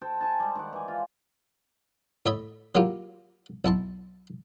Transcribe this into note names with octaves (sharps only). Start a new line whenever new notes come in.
A4 C5 G5
A4 G#5 A5
G3 G#3
D#3 D5 F#5
E3 G#5
F4
A2 C#5 D#5 E5 B5
F#3 A#3 E4 F4 G4
B1 E4 A5 C6